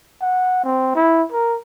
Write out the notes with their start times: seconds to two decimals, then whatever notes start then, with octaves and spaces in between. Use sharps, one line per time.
0.22 F#5
0.64 C4
0.95 E4
1.32 A#4